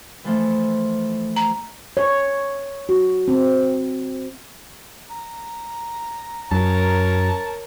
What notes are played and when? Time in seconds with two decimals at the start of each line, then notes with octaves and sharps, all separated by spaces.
0.24 E3 F3 A3
1.36 A#5
1.97 C#5
2.89 F#4
3.28 C4
5.10 A#5
6.51 F#2 A#4 C#5 A5